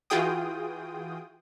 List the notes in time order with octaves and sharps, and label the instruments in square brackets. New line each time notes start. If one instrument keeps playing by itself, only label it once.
[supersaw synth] E3 F4 F#4 G#4 G5 D#6